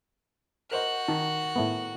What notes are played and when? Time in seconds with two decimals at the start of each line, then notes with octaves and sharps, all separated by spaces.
0.71 F#4 A#4 C5 D#5 F#6
1.08 D#3 A5
1.56 A2 A3 B3